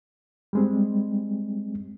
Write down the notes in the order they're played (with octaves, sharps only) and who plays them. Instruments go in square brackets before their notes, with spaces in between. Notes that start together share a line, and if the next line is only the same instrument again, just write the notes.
[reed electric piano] G3 G#3 C4